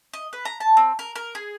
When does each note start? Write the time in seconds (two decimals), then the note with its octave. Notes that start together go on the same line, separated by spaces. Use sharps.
0.14 D#5
0.33 B4
0.45 A#5
0.60 A5
0.77 C4
0.99 A#4
1.16 A#4
1.35 G#4